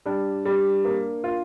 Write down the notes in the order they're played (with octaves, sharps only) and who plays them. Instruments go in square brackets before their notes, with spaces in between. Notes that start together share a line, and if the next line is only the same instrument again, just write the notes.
[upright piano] G3 [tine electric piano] D4
[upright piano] G3
A#3
F4